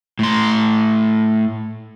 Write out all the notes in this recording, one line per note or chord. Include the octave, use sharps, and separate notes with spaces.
A2 C6